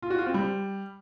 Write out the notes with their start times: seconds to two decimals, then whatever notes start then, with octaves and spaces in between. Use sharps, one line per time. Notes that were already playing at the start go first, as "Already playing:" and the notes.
0.02 F4
0.10 F#4
0.18 F4
0.26 C4
0.34 G3